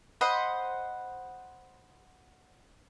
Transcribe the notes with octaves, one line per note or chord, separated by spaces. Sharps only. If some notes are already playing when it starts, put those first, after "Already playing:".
C5 D#5 F#5 B5